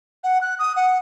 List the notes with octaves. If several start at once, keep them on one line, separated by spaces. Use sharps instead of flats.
F#5
F#6
D#6
F#5